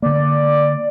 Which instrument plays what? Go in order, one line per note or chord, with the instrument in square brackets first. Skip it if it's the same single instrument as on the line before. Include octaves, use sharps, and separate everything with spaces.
[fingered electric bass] D3 A#3 [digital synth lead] D5